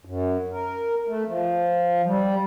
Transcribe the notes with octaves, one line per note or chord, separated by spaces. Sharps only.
F#2
A#4
A3
F3
G3